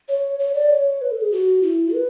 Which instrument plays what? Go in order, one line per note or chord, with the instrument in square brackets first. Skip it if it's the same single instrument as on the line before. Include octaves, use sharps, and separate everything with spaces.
[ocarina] C#5
C#5
D5
C#5
B4
A4
G#4
F#4
E4
B4